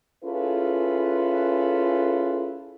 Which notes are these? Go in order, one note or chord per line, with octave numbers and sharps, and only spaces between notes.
C#4 E4 F4 G#4 A4 B4